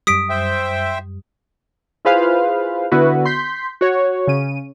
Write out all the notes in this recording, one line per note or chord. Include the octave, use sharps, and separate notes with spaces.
F#2 G3 D#6 B6 D7
C5 E5 G5
E4 F4 G#4 B4 C5 F5
D3 B3 E4 F#4 B4
C6 G6 B6
F#4 C#5
C#3 C#4 D#7